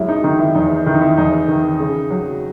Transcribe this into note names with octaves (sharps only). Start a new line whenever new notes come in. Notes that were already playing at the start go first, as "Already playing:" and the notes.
Already playing: F#2 G#3 E4
D#4
D#3 D#4
E4
E2 D#4
D#3 E4
D#4
E4
E2 D#4
D#3
C#3
F#3